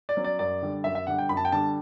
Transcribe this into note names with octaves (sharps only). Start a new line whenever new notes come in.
D5
F#3 C#4
D5
F#2 D5
D3 G3
F#2 E5
E5
D3 G3 F#5
G5
F#2 B5
A5
G5
D3 G3 A5